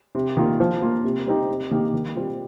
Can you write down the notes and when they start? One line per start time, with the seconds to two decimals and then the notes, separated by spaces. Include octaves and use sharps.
0.15 C3
0.37 D#3 A#3 F4
0.60 F3
0.82 A#3 F4
1.04 C3
1.26 G3 C4 D#4 G4
1.48 C3
1.71 D#3 A#3 D#4 G4
1.93 D#3
2.16 G3 C4 F4